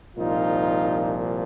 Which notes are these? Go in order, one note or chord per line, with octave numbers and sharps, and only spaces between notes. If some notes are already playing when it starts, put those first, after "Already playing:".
C2 A#2 F3 D#4 F4